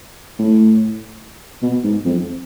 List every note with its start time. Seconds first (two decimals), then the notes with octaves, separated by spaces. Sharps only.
0.39 A2
1.63 B2
1.84 G#2
2.05 F2